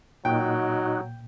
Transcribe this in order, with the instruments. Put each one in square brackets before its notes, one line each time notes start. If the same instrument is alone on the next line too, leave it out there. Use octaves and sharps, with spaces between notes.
[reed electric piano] A#2 [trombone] F#3 [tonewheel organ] D#4 F#4 [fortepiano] G5